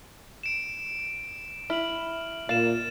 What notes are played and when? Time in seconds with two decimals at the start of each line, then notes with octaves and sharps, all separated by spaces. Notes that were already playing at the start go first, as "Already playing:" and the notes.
0.43 D7 E7
1.70 E4 F6 F#7
2.49 A#2 F5 A6 E7